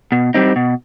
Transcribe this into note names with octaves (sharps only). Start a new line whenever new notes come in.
B2
G3 C4 D#4
B2